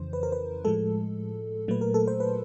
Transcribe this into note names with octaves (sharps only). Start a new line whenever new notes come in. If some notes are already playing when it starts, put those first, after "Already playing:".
Already playing: F2 C#3 E3 C5
B4
A#4
B4
A2 F3 G#3 A4
A#2 F#3 A3 B4
A#4
A4
C5
B4